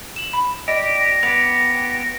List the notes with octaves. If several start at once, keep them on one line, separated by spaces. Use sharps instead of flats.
E7 F#7
B5
G4 D5 D#5 A#6
B3 G4 F7